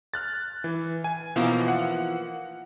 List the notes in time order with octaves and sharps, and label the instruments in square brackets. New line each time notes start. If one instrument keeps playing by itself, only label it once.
[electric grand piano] F6 F#6 A6
E3
G#5
[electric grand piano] B2 [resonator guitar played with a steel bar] E3 F3 A#3
[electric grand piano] F#5